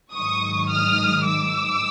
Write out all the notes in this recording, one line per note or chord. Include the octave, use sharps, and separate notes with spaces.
G#2 D#3 F#3 C#6 D#6
D#6 F6
D6 E6